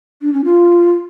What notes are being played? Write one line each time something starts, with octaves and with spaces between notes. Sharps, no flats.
D4
C#4
F4